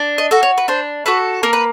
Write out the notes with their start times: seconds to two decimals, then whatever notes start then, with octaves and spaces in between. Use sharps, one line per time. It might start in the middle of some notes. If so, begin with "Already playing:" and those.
Already playing: D4
0.18 D#5
0.31 F#4 A4
0.43 C#5
0.58 B4
0.68 D4 C5
1.06 F#4 A4 B4
1.43 A#3 A#4
1.53 B4